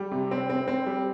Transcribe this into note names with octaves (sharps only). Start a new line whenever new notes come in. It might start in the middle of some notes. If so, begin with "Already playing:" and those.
Already playing: G3
C3
C4
C4
C4
G3